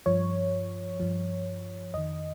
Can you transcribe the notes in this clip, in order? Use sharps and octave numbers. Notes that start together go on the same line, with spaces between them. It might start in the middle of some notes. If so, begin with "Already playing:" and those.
G2 F3 C#5
G2 F3
F2 D#3 D#5